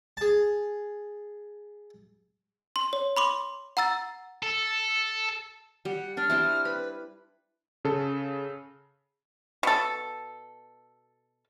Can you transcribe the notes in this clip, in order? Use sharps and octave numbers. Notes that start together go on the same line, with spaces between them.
G#4 A5
C6
C#5
B5 C6 D6
F#5 A#5 E6 A6
A4
G3 F#5
D4 D5 F6
G3 C4 E4
B4 B5
C#3 A4
B2 A4